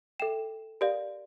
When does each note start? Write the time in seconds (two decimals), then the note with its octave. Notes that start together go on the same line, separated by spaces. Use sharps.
0.20 A4 E5 G5 E7
0.81 G4 A#4 D5 F5